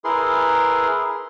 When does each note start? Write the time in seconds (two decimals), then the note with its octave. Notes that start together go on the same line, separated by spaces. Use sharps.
0.04 E4 G#4 A#4 B4 C6